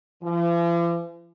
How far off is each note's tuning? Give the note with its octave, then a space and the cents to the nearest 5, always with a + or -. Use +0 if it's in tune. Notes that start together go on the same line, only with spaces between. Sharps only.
F3 -45